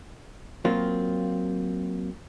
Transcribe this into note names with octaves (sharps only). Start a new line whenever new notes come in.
F#3 A#3 C4 F4